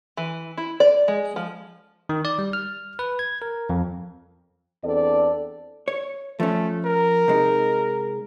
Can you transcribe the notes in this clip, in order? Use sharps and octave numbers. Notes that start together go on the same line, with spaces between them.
E3
E4
D5
G#3
F3
D#3
D5
G3
F6
B4
G#6
A#4
F2
E2 C4 D4 A4 D5
C#5
F3 A3 C#4
A#4
C3 G#3 D#4